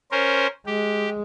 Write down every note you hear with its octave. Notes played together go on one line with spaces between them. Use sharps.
C#4 A#4 C5
G#3 G4